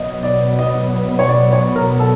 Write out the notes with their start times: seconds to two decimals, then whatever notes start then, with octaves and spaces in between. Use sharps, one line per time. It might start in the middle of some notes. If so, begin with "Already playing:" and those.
Already playing: B2 F#3 B3 D#5
0.23 D5
0.59 D#5
1.19 C#5
1.28 D5
1.53 C#5
1.76 A#4
2.00 A4